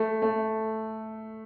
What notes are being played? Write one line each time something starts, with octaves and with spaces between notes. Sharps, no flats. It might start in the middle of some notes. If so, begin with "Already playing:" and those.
Already playing: A3
A3